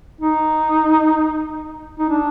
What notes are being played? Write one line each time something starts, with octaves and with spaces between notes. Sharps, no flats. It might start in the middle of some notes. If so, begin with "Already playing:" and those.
D#4
D#4
D4